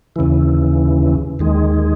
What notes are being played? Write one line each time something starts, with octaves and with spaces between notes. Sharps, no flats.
D#2 C#3 E3
D#2 D#3 G#3